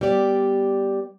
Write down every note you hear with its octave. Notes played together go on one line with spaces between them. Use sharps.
G3 B3 G4 D5